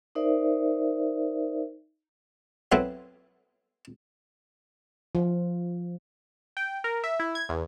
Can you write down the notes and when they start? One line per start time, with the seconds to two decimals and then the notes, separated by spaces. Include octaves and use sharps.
0.15 D#4 A#4 C5 D5 E5
2.72 F#3 B3 C4 E4 A4 B4
5.15 F3
6.57 G5
6.84 A#4
7.04 E5
7.20 E4
7.35 G#6
7.49 E2